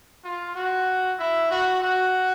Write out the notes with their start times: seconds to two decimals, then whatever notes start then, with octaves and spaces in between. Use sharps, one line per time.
0.24 F4
0.55 F#4
1.19 E4
1.50 F#4
1.82 F#4